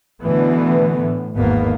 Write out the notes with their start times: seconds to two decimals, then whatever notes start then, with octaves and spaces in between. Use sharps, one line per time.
0.21 B2 D3 E3 A3 B3
1.01 A2
1.36 G#1 E2 G#2 A#3 B3